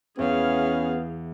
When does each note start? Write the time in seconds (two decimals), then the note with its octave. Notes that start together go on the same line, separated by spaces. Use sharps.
0.19 E2 B3 C#4 G#4 F5